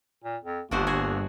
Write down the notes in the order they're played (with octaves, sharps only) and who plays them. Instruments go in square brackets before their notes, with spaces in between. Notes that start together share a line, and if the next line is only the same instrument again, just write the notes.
[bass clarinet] A#2
F2
[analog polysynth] G1 [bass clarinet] D#2 [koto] D4 F#4 C5
[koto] F#4 G#4